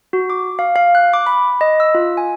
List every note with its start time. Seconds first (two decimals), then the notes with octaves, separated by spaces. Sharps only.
0.13 F#4
0.30 D6
0.59 F5
0.76 F5
0.95 F#6
1.13 D6
1.27 B5
1.61 D#5
1.80 E6
1.95 F4
2.17 G#5